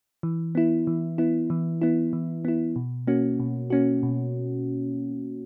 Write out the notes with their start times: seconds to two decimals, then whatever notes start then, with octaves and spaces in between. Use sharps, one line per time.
0.23 E3
0.55 B3 E4
0.87 E3
1.18 B3 E4
1.50 E3
1.82 B3 E4
2.13 E3
2.45 B3 E4
2.76 B2
3.07 A#3 C#4 F#4
3.40 B2
3.70 A#3 C#4 F#4
4.03 B2